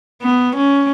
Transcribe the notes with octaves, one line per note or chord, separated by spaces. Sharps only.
B3
C#4